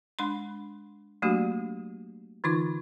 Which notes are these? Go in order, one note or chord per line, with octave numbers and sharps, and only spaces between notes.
G#3 D4 B5 C6
F#3 A3 A#3 D4 F#4 G4
D3 E3 D#4 F4 C#6